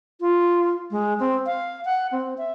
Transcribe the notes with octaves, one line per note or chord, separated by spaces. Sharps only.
F4
G#3
C4
F5
F#5
C4
E5